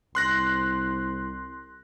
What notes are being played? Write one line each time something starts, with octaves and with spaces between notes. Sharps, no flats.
C2 C6 F#6 A#6